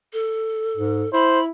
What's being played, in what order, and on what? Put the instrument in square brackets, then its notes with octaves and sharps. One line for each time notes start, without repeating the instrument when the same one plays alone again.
[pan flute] A4
[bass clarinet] G#2
[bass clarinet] E4 [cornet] C5 [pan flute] B5